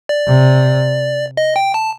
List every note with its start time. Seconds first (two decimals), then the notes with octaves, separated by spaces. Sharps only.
0.09 D5
0.27 C3
1.37 D#5
1.56 G5
1.74 A5